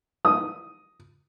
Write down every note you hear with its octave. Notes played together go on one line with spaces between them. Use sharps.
D#6